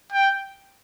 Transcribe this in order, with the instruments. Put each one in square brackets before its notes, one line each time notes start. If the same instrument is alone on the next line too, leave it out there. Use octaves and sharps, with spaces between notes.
[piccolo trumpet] G5